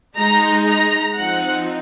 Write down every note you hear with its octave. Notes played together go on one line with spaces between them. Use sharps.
G#3 D#4 A#5
A#5
F3 C4 D#4 F#5